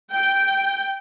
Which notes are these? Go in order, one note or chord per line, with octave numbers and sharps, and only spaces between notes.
G5